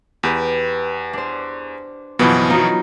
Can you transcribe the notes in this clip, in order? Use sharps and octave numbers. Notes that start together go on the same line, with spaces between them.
E2 G4 B4
D4 C5
F#1 B2 E3 F3 B3 D#4
F#3 D#4 F4